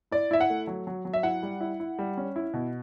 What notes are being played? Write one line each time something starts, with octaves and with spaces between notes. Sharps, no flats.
E4 D5
E4 E5
F#5
A3
F#3
F#3
F#3
E5
E4 F#5
G3
E4
E4
G3
C#4
E4
B2